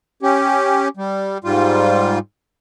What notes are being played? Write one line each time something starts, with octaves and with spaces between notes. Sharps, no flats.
C#4 G4
G3
G#2 G3 F4